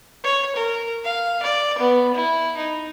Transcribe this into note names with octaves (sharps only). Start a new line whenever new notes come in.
C#5
A#4
F5
D5
B3
E4
D#4